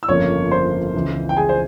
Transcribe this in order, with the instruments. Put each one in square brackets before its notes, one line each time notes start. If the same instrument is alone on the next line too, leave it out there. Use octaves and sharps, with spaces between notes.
[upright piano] E6
[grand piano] G1 F2 C#3 F3 A#3 [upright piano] C#5 C#6
[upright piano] C5 C6
[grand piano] C#2 C#3 E3
[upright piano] G5
G#4 G#5
C5